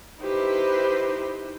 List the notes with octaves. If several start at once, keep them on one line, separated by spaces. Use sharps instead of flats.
D#4 E4 G4 B4 C5